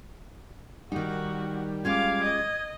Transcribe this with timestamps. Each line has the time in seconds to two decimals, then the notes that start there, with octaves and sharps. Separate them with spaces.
0.92 D#3 G3 D#4 F#4
1.85 G#3 C#4 F4 F5 D6 G#6
2.23 D#5